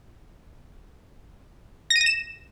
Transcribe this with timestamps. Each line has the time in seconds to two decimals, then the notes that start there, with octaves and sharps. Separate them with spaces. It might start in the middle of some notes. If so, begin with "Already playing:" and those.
1.90 A#6
1.96 D#7
2.01 A#6
2.06 E7